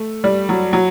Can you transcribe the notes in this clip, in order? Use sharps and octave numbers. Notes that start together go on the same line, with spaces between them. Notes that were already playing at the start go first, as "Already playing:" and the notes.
Already playing: A3
G3
F#3
F#3